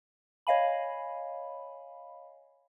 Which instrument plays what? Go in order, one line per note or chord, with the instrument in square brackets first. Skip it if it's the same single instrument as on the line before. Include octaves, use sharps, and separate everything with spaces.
[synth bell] C#5 D#5 F5 G#5 B5